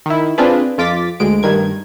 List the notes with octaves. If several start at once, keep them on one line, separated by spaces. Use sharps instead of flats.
D#3 E4
C4 D4 F4 G#4 B4
F2 F4 D6 A6 B6
D2 G#3 D7
G2 D#3 G#6